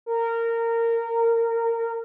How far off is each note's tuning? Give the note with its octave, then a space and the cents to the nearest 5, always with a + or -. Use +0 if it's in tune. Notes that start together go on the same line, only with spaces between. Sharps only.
A#4 -20